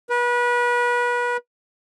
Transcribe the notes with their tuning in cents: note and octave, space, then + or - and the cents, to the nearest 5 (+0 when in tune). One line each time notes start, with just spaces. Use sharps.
B4 -30